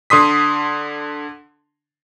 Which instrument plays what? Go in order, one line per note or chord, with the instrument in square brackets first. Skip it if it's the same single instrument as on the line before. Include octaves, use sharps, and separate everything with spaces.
[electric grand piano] D3 C6 D#6 B6